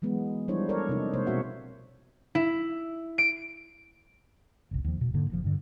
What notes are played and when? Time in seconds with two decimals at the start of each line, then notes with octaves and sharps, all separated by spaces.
0.02 E3 F#3 G#3 B3
0.48 F3 G3 D4 E4 C5 C#5
0.69 A4 A#4 C#5 D5
0.89 C3 D#4
1.13 C3 G#3 A#3 C5 C#5
1.27 B2 C4 F#4 C#5 E5 F#5
2.35 E4
3.18 D7
4.71 F#1 C2
4.84 D#2 F3
5.01 E1 B2
5.14 G#2 D3 A#3
5.30 F1 F2 F3
5.44 G2 D3